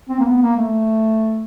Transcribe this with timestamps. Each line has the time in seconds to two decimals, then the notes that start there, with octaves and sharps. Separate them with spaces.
0.09 C4
0.20 A#3
0.25 B3
0.42 A#3
0.57 A3